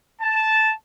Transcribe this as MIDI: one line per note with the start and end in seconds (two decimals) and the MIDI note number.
0.21 0.71 81